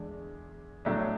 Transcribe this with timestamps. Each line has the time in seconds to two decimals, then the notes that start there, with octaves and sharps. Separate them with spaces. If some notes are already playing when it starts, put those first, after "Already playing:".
Already playing: E2 D3 G#3
0.85 A2 F#3 A3 D4